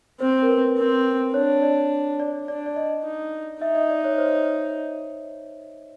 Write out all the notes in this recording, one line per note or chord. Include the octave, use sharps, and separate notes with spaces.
C4 C5
A#4
B4
C4 A#4
D4 C#5
D5
D5
D4 D5
D5
D#5
D#4
D#4 E5
D#5
D5
C#5
C5